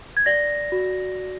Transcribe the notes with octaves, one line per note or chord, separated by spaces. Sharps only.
G#6
D5 A#6
F#4